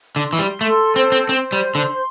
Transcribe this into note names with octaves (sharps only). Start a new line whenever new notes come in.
D3
C6
E3
G3
A3 A4
C4 C5
C4
C4 C5
G3
C6
D3